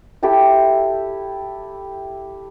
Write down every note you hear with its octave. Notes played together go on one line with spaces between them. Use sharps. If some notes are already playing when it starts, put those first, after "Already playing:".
E4 G4 A4 G5